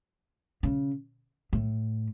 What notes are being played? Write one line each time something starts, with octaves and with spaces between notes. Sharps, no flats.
C#3
A2